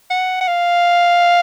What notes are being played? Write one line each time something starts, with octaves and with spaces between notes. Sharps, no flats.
F#5
F#5
F5